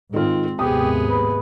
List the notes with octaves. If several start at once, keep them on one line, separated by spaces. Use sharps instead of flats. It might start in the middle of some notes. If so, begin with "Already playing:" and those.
G#2 D#3 C4 F4
D#2 G#2 C3 B3 G4 G#4 D#6
B4